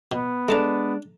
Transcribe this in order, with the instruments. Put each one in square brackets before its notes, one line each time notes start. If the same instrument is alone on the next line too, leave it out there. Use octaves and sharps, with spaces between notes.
[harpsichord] B2 [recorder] B3
[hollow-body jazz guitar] G#3 D4 [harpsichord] A3 A5 A#5